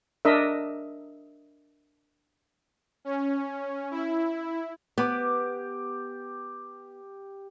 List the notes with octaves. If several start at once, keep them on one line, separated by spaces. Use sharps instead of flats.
D4 A#4 D#5 E5
C#4
E4
B3 G4 D6